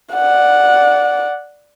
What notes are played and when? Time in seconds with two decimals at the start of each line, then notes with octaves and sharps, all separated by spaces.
0.14 D5 F#5